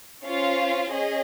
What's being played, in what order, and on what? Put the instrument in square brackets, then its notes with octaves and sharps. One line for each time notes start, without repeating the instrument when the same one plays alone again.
[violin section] C#4 F4 C5 F5
C#4 G#4 D#5